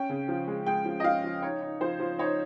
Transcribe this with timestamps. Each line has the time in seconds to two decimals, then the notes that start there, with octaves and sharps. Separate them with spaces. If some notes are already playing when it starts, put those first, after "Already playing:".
Already playing: C#4 G5
0.10 C#3
0.28 F3
0.47 G#3
0.66 G#3 G5
0.85 F3
1.00 D#5
1.04 F3 F5
1.24 F3
1.42 D#4 C#5
1.61 D#4
1.81 F3 C5
2.00 F3
2.19 D#4 C#5